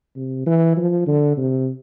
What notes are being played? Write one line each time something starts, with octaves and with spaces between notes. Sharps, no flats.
C3
E3
F3
D3
C3